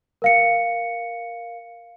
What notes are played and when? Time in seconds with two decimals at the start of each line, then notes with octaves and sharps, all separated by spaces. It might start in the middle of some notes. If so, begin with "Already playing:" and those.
0.22 A#4 F5 C#7